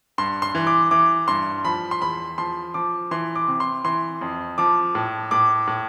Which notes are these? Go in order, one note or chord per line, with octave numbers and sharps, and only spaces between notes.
G2 C6
C6
E3
D6
E3 D6
G2 C6
F3 B5
C6
E2 B5
F3 C6
F3 D6
E3 C6
D6
C3
C6
E3 C6
F2
F3 D6
A2
A2 D6
A2